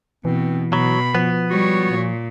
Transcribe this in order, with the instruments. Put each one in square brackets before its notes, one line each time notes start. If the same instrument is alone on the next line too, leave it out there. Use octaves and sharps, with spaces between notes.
[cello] B2 [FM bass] E3 [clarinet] C4
[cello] B2 [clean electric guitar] F#3 [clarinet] B5
[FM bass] F3 [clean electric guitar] B3
[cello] G3 C#5 [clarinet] F#4
[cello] A#2